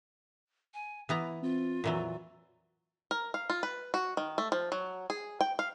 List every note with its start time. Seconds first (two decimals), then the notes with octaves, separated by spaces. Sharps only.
0.74 G#5
1.09 E3 B3 E4 A#5
1.43 C4 F4
1.84 F2 A#2 E3 F#3
3.11 A#4
3.34 F5
3.50 F4
3.63 B4
3.94 F#4
4.17 D#3
4.38 A3
4.52 F3
4.72 F#3
5.10 G#4
5.41 G5
5.59 F5